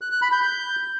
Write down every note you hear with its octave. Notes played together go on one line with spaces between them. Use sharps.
F#6
F#6
B5
G6
G6